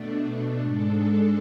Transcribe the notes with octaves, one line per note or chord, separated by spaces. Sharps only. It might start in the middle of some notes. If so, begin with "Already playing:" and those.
Already playing: B2 A3 D4
G#2 G#3 D4 A4